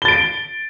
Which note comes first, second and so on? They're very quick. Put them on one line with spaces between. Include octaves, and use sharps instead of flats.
G7 A6 D7